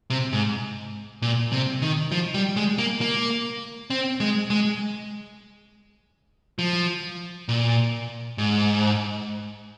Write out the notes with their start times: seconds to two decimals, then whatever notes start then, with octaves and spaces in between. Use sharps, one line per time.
0.10 C3
0.33 G#2
1.22 A#2
1.52 C3
1.82 D#3
2.12 F3
2.34 G3
2.57 G#3
2.78 A#3
3.01 A#3
3.90 C4
4.20 G#3
4.50 G#3
6.59 F3
7.49 A#2
8.38 G#2